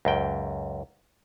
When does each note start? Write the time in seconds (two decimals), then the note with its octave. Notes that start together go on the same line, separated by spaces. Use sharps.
0.05 C#2 F#2 G5